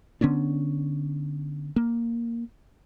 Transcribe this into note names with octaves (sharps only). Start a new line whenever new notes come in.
D3 B3 C#4 D4
A#3